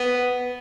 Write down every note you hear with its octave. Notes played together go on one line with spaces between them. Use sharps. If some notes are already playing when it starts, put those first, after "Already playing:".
Already playing: B3